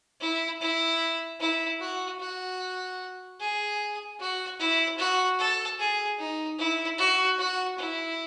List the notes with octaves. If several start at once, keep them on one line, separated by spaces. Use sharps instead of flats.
E4
E4
E4
F#4
F#4
G#4
F#4
E4
F#4
A4
G#4
D#4
E4
F#4
F#4
E4